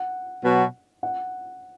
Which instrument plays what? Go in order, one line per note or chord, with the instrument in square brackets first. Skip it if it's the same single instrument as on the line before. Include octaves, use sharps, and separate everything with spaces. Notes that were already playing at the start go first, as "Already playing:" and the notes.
Already playing: [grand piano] F#5
[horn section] B2 F#3 B3 F#4
[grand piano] F#5